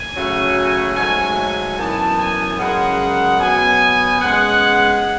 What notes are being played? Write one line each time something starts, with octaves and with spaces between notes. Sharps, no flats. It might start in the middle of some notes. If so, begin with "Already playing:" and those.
Already playing: G#5
C#3 F#3 A3 C#4
G#5
G#2 F#3 A3 G#5
F#2 E3 B3 A5
G#5
F#2 C#3 G#3 F#5
B2 F#3 B3 G#5
C#3 G#3 B3 F#5